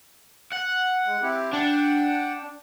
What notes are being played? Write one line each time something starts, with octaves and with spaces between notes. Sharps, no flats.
F#5
G#3
C4 E4 G4
D4 F#5 G5